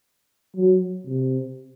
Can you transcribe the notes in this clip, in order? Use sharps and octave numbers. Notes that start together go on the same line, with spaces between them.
F#3
C3